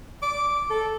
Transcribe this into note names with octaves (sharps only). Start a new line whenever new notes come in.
D6
A4